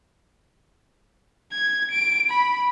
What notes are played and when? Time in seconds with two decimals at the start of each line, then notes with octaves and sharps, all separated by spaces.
1.53 G#6
1.91 D7
2.30 B5